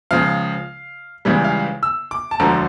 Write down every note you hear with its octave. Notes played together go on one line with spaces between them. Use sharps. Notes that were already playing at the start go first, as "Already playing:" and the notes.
C#2 C#3 F3 F5
C#2 C#3 E3 G3
F5
E6
D6
A5
E1 D2 D3 F3 A#5